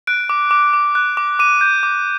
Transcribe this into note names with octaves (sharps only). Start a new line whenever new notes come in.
F#6 D7
D6
D6
D6
F#6
D6
D6 D#7
G6
D6